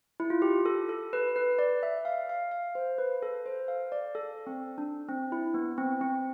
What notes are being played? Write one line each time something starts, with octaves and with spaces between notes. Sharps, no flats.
E4
F4
G4
A4
A4
B4
B4
D5
E5
F5
F5
F5
C5
B4
A4
C5
F5
D5
A4
C4
D4
C4
E4
B3
C4
C4